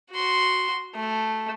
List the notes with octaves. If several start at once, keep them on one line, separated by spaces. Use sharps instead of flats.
F#4 C6
A3